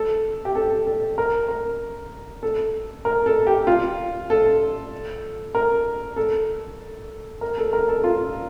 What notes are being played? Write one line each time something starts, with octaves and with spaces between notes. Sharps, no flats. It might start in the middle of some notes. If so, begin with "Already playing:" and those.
Already playing: A4
G4
A4
A4
A#4
A#4
A4
A#4
A4
G4
F4
A4
A#4
A4
A#4
A4
A#4
A4
F4